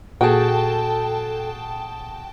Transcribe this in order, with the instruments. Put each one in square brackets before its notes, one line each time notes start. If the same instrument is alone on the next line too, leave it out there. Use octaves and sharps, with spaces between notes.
[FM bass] A#2 [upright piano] F#4 G#4 [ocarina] A4 [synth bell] G5 A5